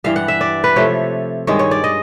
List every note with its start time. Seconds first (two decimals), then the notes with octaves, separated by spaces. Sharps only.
0.04 G2 E3 G3 F5
0.16 F#5
0.28 E5
0.41 D5
0.64 B4
0.76 C3 F3 A3 C#5
1.47 G2 D#3 G#3 C#5
1.59 C#5
1.71 D5
1.84 D#5